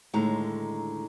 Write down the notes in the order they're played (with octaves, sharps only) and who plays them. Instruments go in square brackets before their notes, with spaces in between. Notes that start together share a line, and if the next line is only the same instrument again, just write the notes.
[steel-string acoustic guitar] D#2 A2 D3 G#3 D#4 A#5